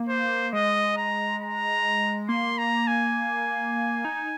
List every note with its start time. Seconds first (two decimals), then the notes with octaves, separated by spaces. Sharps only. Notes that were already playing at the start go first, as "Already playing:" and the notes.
Already playing: A#3
0.09 C5
0.53 G#3 D#5
0.97 A#5
1.41 A#5
2.29 A#3 C6
2.58 A#5
2.87 G#5
4.05 D#4